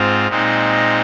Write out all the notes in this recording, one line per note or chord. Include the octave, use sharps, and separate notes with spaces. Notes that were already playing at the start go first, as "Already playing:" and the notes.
Already playing: G#2 C4 F4
A#2 G#3 C4 D#4